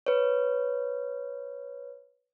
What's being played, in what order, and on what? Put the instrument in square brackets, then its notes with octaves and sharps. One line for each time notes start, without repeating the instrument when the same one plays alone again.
[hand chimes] B4 C#5